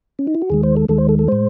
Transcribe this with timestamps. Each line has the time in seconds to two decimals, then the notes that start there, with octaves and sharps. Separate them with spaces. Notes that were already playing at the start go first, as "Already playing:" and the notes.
0.19 C#4
0.27 D#4
0.35 E4
0.42 F#4
0.50 D#2 D#3 G#3 G#4
0.63 C5
0.77 A4
0.89 D#2 D#3 G#3 A4
0.98 C5
1.09 A4
1.19 A4
1.28 A2 G#3 C5